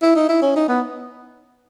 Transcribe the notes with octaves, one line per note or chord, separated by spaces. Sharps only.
E4
D#4
E4
C#4
D#4
B3